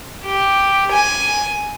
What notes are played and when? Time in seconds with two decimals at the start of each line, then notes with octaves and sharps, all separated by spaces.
0.24 G4
0.91 G#5